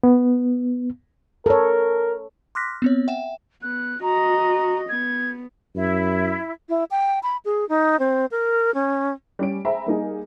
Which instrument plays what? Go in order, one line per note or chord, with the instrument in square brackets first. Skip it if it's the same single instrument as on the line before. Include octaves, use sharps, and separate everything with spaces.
[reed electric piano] B3
[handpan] A4 C#5 [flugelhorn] A#4
[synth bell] C6 D6 F6 F#6 A#6 B6
B3 C4 C#5
E5 F#5 G5 E7
[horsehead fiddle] B3 [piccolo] F#6
[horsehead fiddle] F#4 D#5 [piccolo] A#5
[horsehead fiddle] B3 [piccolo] G#6
[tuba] F#2 [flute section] E4
[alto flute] E4
G5
B5
G#4
D#4
C4
A#4
C#4
[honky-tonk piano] G3 C#4 D7
G#4 C5 E5 G5 A#5 B5
G3 A#3 D#4 G#4